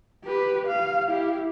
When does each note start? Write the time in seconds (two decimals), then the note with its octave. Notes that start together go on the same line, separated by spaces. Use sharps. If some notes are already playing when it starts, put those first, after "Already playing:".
0.24 G4 B4
0.67 F5
1.07 E4 G4